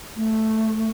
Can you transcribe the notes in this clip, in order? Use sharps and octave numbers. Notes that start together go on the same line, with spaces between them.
A3